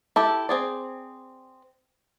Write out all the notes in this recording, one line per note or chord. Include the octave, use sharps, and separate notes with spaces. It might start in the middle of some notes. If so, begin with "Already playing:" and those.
E4 G4 A4 A5
C4 G#4 D5